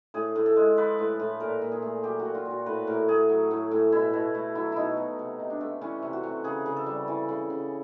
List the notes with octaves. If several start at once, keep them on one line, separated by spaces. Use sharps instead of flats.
A2 G#4
A2
A4
G#3
F3 B4
A2
A2
A#2 A#4
A#2
G#4
A3
F#3 G4
F#4
A#2
F4
A#2
F#4
A2 B4
A2 A#4
A3 G#4
F#3
A2
A2
B2 E4
B2
A3
F#3 E4
B2 D#4 E4
B2
C3
C3
D4
A3
E3 C#4
C3
F#4
C3
C#3 G#4
C#3
A4
G3
E3
C#3
C#3